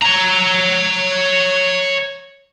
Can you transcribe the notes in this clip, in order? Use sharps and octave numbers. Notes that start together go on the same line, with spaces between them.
C#5 A#5